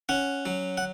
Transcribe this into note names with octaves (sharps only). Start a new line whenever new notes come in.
C#4 F#5
F#3
F#5